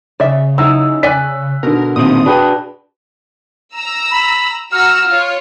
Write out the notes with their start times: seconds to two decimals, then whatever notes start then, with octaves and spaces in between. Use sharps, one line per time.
0.20 C#3 D5 E5
0.58 F#3 D#4 E4 E6
1.03 D5 G#5 F#6 B6
1.63 B2 D3 A#4
1.96 A#2 D#3 C4 D#6
2.26 D4 F#4 G#4 B4 G5
3.75 A#5 E6
4.11 B5
4.72 F#4 A#5 E6 F6
5.09 F4 C#5